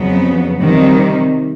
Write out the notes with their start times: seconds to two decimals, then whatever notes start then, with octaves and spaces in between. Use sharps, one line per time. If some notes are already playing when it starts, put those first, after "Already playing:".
Already playing: F2 C#3 F#3 B3
0.60 C3 D#3 G3